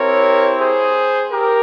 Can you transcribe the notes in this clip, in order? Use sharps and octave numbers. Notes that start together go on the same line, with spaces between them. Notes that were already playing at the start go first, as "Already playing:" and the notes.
Already playing: C4 E4 G4 A#4 C#5
G#4 C5
G4 A#4